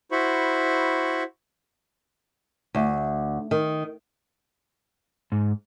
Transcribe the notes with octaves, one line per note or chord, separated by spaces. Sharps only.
E4 F#4 C5 B5 C#6
D2
D#3
G#2